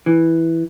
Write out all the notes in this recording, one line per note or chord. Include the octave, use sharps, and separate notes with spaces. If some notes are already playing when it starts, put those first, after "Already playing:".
E3